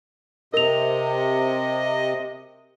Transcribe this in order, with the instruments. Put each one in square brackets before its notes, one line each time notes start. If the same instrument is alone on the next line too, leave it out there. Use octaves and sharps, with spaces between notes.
[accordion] C3 [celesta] A#4 F7 [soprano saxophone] D#5